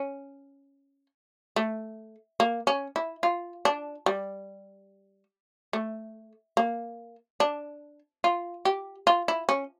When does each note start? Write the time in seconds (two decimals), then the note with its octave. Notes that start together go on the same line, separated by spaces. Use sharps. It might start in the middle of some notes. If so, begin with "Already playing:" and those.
Already playing: C#4
1.56 A3
2.40 A#3
2.67 C#4
2.96 E4
3.23 F4
3.65 D4
4.06 G3
5.73 A3
6.57 A#3
7.40 D4
8.24 F4
8.65 G4
9.07 F4
9.28 E4
9.49 C#4